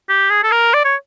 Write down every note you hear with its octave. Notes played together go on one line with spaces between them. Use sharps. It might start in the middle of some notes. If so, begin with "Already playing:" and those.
G4
G#4
A4
A#4
D5
C#5